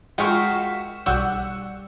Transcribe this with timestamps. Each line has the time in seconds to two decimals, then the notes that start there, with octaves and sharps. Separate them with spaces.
0.18 G#3 F4 F#4 A#4 E5 F5 G5 C#6
1.06 B1 G3 F#5 C#6 E6